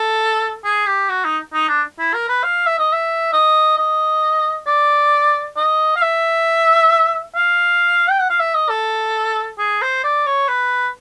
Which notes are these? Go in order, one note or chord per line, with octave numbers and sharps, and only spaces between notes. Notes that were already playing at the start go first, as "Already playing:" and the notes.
Already playing: A4
G#4
G4
F#4
D#4
D#4
D4
E4
A#4
B4
F5
E5
D#5
E5
D#5
D#5
D5
D#5
F5
E5
F5
G5
F#5
F5
E5
D#5
A4
G#4
C5
D5
C#5
B4